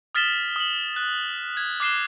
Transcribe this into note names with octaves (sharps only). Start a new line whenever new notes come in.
D#6 F6 A6 B6 E7 G7
D#6 F#7
F#6
G#6
D6 F#6 C7 E7 G7